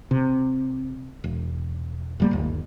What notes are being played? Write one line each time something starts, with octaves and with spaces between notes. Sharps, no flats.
C3
E1
F1 G3 A#3
G1 D#2